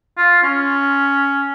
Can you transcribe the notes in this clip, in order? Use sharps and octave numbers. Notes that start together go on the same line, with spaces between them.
F4
C#4